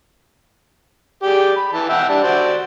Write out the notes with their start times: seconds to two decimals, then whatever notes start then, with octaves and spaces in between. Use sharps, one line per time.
1.23 G4 G#4 D5
1.56 B5
1.73 E3 A5
1.89 E5 F#5 G5
2.09 G3 D4 A5
2.23 F#4 C5 D5